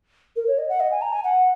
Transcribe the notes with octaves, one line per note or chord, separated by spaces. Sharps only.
A#4
C#5
D#5
F#5
D#5
G#5
A#5
G#5
F#5